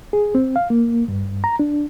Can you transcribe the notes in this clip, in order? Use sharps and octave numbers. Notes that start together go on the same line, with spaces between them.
G#4
C4
F5
A#3
G2
A#5
D4